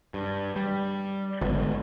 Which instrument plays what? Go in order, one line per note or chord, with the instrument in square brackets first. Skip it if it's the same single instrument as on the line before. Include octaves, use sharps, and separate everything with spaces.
[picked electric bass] G2
G3
[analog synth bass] G#1 [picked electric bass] D3 G#3 B3